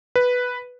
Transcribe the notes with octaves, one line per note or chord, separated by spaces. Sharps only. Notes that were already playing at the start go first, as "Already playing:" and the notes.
B4